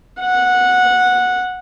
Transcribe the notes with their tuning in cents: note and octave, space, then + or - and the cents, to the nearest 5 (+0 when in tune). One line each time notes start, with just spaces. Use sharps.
F#5 -10